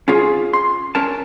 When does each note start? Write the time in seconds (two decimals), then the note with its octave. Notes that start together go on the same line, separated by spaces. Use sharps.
0.08 C#4 F4 G#4
0.53 C6
0.95 C#4 A#4 A5